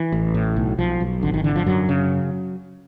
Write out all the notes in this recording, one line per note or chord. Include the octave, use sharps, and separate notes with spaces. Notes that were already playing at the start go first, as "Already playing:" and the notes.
Already playing: E3
A1
A2
B1
B1 F3
B1
G#1 D3
D#3
D3 E3
F3
F#2 F#3
C#3